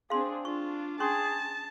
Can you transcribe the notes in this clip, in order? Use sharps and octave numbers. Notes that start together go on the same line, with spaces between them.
C4 D4 G#4 F5 C6
D4 F4 C#6
C#4 G#4 A5 C6 C#6